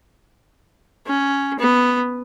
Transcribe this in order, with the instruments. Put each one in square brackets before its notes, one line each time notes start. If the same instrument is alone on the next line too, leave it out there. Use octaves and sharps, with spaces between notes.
[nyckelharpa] C#4
B3